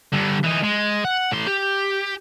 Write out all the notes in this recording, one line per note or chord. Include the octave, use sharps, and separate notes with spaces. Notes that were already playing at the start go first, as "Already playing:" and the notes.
G2 D3
E3 D#4
G#3
F#5
A2 C6
G4